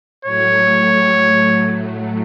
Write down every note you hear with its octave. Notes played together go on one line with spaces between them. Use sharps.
A2 F#3 A3 C#5